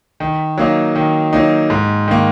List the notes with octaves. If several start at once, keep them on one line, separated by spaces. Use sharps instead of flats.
D#3
F#3 A#3 D#4
D#3
F#3 A#3 D#4
G#2
D#3 A#3